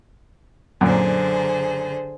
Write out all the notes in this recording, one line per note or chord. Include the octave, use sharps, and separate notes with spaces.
F#2 A#2 D3 G#4 C5